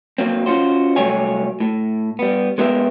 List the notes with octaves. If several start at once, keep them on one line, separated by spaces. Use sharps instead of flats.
F#3 A#3 C4
C#4 F4 F#4 C5
C2 F#3 A3 G4 C#5 G#5
A2
G3 B3
G#3 B3 G4 A#4 E5